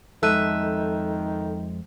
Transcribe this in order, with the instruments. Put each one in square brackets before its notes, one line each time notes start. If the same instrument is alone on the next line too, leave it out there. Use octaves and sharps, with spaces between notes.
[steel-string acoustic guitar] F2 G#3 E5 [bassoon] D#3 [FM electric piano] A4 [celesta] E6 F#6 D#7